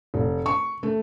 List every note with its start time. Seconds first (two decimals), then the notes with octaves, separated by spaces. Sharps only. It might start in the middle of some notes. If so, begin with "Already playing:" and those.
0.14 F1
0.46 C#6
0.83 A3